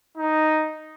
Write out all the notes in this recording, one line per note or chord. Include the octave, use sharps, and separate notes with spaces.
D#4